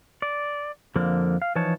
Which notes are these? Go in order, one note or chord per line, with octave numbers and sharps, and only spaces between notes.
D5
F2 D3 F3 A#3
F5
E3 F3 D#4 C#5 A5